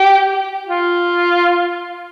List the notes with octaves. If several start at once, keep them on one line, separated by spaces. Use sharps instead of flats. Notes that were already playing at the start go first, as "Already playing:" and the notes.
Already playing: G4
F4